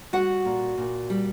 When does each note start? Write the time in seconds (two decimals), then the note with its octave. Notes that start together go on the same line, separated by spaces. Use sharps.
0.13 G3 F#4 F#5
0.45 A#2
0.78 A#2
1.10 G3